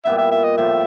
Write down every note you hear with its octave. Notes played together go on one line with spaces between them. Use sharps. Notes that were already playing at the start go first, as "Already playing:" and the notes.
A#2 G3 B3 E4 E5
E5
E5
D#5
A2 F3 A3 E5